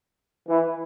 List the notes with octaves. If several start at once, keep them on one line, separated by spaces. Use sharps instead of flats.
E3